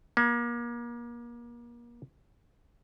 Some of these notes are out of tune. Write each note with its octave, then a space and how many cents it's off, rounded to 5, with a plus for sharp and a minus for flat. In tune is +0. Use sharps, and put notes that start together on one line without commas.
A#3 +35